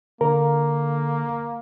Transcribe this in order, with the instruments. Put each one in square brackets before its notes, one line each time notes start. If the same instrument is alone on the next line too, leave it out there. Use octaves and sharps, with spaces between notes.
[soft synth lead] D3 [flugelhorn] A#3 [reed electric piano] A#4